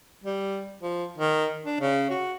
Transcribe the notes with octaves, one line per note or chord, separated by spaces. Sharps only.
G3
F3
D#3
D4
C#3
F#4